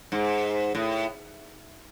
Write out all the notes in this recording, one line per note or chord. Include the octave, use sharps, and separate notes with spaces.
G#2
A2